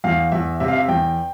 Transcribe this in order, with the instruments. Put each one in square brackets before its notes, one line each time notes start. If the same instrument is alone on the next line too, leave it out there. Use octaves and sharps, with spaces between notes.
[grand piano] E2 F5
E2 E5
C3 E5
F5
E5
E2 G5